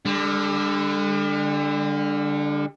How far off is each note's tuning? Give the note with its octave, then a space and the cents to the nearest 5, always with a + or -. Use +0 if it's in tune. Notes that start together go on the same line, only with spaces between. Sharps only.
D3 +0 G3 +40